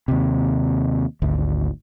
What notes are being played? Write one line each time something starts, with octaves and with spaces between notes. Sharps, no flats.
D#2 C3
G#1 D2